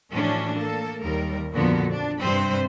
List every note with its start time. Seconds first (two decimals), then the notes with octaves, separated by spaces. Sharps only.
0.12 A2 E3 F3 C#4 D4 F#4
0.55 A#3 A4
1.02 D#2 G3 A#4
1.53 F2 A#2 D3 F3 B3 F#4
1.90 D4
2.21 G2 C3 G3 C4 B4 C5